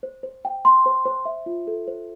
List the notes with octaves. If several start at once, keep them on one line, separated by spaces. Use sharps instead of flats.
C5
C5
G5
C6
C5
C5
E5
F4
A4
C5